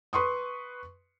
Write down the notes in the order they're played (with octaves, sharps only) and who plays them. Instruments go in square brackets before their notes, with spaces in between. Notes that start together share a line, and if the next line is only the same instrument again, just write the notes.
[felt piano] B4 C6 C#6 D#6